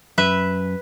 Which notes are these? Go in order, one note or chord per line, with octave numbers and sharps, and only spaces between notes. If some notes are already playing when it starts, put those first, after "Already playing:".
F#2 B4 E5